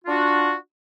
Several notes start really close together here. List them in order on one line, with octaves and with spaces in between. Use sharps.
F4 D4 F#4